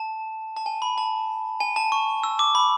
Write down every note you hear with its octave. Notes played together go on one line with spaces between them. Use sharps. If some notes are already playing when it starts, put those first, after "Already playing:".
Already playing: A5
A5
G#5
B5
A5
G#5
A5
C#6
E6
D6
B5